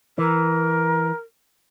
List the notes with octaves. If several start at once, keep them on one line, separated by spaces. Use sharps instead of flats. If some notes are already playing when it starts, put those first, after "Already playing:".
E3 A#4